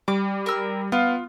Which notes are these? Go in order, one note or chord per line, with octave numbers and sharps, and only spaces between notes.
G3 D6
A#4 E6
B3 F4